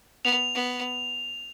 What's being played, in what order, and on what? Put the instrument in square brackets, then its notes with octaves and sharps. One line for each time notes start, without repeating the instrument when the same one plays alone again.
[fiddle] B3 [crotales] F7
[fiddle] B3